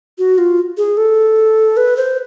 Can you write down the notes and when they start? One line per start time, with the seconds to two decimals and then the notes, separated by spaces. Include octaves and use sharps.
0.18 F#4
0.38 F4
0.77 G#4
0.97 A4
1.77 B4
1.97 C5